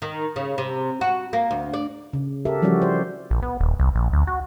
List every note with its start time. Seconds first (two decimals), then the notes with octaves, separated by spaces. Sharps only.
0.02 D#3
0.36 C#3
0.58 C3
1.01 F#4
1.33 A#3
1.51 D2
1.74 D5
2.13 C#3
2.45 G4 A4 A#4 E5
2.62 E3 F3 G3 C#4 F#4 D5
2.82 C5
3.30 A#1
3.42 B3
3.60 D#1
3.80 C2
3.95 A#1
4.13 D2
4.27 F#4